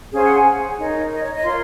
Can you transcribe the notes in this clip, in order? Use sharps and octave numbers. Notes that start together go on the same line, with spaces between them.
C#4 G#4 C5 F5
F#5
G#5
D#4 A#4 C#5
D#5
C#5
D#5
F4 A#4 C#5 C6